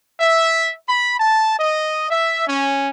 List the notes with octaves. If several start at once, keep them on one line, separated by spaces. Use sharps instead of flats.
E5
B5
A5
D#5
E5
C#4